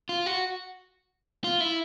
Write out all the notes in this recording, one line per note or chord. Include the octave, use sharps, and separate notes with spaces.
F4
F#4
F4
E4